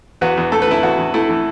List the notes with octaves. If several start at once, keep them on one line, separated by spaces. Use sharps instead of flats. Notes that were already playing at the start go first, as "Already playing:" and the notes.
E2 F#4 B4
E2
A3 A4
B4
E3 E4 A4
E2 F#4
E2
A3 E4 A4
E3